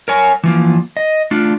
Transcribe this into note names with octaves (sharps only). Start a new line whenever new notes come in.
A#4 C#5 G#5
E3 F3 A#3
D#5
A3 D4 F4